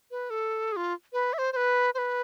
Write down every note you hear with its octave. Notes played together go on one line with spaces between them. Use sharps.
B4
A4
G#4
F4
B4
E5
C5
C5
B4
C5
B4